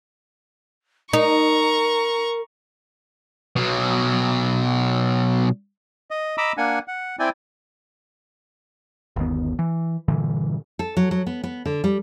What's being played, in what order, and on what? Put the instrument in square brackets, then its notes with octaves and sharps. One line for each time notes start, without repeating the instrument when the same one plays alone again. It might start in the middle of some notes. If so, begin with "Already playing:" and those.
[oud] D#4 [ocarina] A#4 [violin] A#5 C#6
[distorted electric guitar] B2 F#3
[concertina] D#5
D#5 A#5 B5 D6 E6
A#3 D4 F#5 G#5
F#5
C4 E4 D5 G5 G#5
[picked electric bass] G1 D#2 B3
E3
G2 A#2 D3 E3
[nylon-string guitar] A4
F#3
F#3
B3
B3
D3
G3